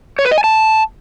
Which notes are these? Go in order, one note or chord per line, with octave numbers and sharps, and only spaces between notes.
C#5
B4
D#5
G#5
A5